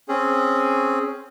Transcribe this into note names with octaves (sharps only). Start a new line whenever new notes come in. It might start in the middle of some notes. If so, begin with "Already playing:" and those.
C4 C#4 G#4